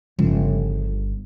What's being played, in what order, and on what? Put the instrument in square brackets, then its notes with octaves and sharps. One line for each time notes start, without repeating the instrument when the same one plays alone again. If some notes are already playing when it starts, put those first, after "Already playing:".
[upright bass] G1 [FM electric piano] C#3 F3